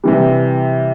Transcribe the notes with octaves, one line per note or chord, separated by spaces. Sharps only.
C3 E3 G3